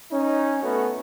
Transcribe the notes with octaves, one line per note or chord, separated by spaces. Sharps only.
C#4 D#4
A3 B3 C#4 F#4